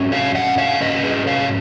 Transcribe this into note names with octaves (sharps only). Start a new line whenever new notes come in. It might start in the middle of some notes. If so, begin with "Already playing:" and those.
Already playing: G#2 F#3 C#4
C#5 F5
D#5 F#5
C#5 F5
G#2 F#3 C#4 B4 D#5
G#4 B4
C#5 F5